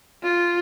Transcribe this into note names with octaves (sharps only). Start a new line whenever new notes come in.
F4